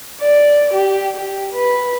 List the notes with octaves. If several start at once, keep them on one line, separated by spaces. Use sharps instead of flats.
D5
G4
G4
B4